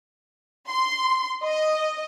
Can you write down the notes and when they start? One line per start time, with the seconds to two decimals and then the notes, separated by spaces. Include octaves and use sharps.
0.68 C6
1.43 D#5